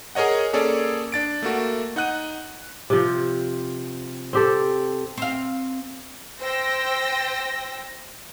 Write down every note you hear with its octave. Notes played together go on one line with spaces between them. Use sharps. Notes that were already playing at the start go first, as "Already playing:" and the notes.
G#4 A#4 C#5 D#5 F#5
A#3 C#4 G#4 A4 C#5 D5
D4 A6 D7
A3 A#3 F#4
D#4 F#5 F#6 D#7
C3 F3
C4 G4 A4
C4 F5
C5 G5 E6 A#6